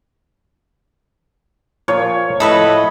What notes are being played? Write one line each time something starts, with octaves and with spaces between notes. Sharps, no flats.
A#2 F3 F4 C#5
A2 F3 A4 B4 D#5 E5